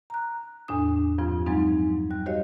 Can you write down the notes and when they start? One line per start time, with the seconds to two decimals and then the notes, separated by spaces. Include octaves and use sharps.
0.10 A#5 F#6
0.68 E2 A2 D4 D#6
1.18 G2 F3 C4 F4
1.46 F3 F#3 G#3 C4 D#4
2.11 G3 F#6
2.26 F#4 G4 C5 C#5 D#5 F5